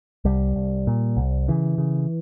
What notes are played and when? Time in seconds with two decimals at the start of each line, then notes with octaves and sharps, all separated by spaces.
0.25 C2 G3
0.56 C2
0.87 A#2
1.17 C2
1.48 C#3 E3
1.78 C#3